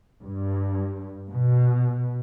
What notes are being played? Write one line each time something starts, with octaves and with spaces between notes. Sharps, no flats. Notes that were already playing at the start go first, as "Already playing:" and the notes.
G2
B2